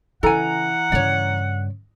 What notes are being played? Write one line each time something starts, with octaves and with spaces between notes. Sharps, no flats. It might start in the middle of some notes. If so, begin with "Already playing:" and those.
C#3 E3 A4 F#5 G#5 A#5
G2 C#3 C#5 D5